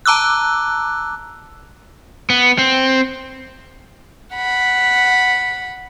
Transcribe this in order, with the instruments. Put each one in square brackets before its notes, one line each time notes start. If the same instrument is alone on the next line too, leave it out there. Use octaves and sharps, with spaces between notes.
[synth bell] A5 A#5 D6 E6 F#6
[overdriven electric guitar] B3
C4
[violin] F#5 B5